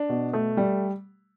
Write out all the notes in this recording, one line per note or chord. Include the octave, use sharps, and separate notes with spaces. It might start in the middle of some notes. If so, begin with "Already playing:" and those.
Already playing: D4
B2
A3
G3